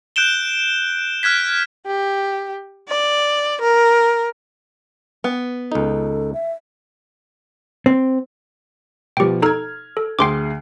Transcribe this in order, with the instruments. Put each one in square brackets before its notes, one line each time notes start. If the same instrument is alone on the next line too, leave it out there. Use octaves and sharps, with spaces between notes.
[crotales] F#6 G6 D7 E7 G7
F6 F#6 G#6 B6
[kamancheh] G4
D5
A#4
[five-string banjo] B3
[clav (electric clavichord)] C#2 D#4 [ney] A4
[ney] E5
[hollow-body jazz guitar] C4
[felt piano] B2 F3 [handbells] G4 G5
[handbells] D#4 A4 A#5 [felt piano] F6 G#6
[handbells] A4
[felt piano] D2 G#4 C7 [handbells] G5 C6 D6